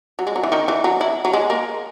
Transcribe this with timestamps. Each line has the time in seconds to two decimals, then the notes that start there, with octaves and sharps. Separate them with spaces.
0.19 F#3
0.27 G#3
0.36 F#3
0.43 E3
0.52 D#3
0.68 E3
0.84 F#3
1.01 E4
1.25 F#3
1.33 G#3
1.50 A#3